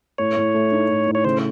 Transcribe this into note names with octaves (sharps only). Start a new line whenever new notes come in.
A2 C#5
A2
A3
D#4
A2
A2
C#5
C#3 C5